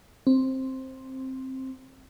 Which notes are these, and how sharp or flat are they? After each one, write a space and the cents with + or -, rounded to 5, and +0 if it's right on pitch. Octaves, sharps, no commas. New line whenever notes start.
C4 +10